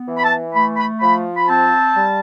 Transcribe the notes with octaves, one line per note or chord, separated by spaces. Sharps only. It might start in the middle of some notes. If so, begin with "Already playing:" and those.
Already playing: B3
E3
B5
A5
A3 B5
B5
F3 B5
B5
C4 A5
G3